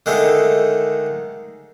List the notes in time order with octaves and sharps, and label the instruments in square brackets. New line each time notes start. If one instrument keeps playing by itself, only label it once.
[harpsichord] D3 D#3 G#3 A3